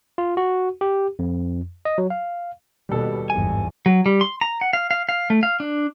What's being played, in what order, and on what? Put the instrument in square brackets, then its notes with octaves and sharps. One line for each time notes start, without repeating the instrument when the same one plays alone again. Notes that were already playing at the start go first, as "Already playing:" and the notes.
[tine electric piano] F4
F#4
G4
F2
D#5
F#3
F5
[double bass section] D#2 B2 [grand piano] G3 A4
[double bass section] G1 E2 G#2 [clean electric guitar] G#5
[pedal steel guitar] F#3
G3
C6
A#5
F#5
F5
F5
F5
A3
F5
D4